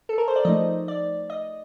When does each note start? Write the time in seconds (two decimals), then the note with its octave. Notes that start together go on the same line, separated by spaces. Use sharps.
0.09 A4
0.18 A#4
0.28 C5
0.36 D5
0.45 F3 A3 D#4 D#5
0.88 D5
1.30 D#5